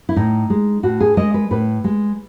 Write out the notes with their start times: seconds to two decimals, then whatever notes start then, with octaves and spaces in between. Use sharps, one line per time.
0.09 E4
0.16 A2 D#4
0.50 G#3
0.83 A2 F#4
1.00 G#4
1.17 G#3 D#5
1.34 B4
1.51 A2 B4
1.84 G#3